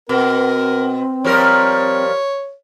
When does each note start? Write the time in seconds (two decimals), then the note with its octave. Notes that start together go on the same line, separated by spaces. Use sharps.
0.09 B2 C4 A#4
1.24 F3 G3 A#4 C#5